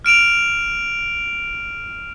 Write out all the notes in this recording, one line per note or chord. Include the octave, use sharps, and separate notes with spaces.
F6 D7 E7 F7